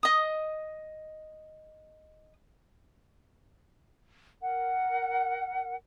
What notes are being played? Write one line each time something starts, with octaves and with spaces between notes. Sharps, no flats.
D#5 D#6
A#4 F#5